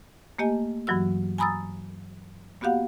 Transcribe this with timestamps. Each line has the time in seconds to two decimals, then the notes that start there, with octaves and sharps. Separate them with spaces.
0.39 A3 A#3 G4 D#5 G#5
0.87 G2 E3 F#3 F#4 E6
1.38 G#5 A#5 B5 D#6 E6 A6
2.61 A#3 B3 F#4 G4 F5 F#5